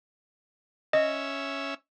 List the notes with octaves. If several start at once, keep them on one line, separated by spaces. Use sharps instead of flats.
C#4 D#5 E5